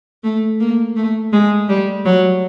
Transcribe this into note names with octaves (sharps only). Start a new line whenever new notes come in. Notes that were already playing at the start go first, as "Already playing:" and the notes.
A3
A#3
A3
G#3
G3
F#3